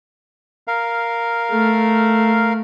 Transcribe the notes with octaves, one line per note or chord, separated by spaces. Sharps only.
A#4 F5
A3